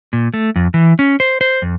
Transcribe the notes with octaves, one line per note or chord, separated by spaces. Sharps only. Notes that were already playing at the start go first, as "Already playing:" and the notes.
A#2
A3
F2
E3
C#4
C5
C5
F2